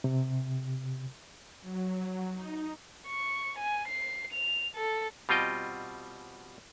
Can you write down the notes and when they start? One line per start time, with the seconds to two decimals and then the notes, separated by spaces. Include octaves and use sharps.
0.04 C3
1.62 F#3
2.33 D#4
3.07 C#6
3.59 G#5
3.88 C7
4.33 F7
4.75 A4
5.29 B2 G3 C4 F4 D#5 G5